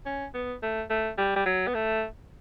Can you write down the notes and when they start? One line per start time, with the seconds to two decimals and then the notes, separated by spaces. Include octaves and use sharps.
0.06 C#4
0.34 B3
0.63 A3
0.90 A3
1.18 G3
1.36 G3
1.46 F#3
1.67 B3
1.75 A3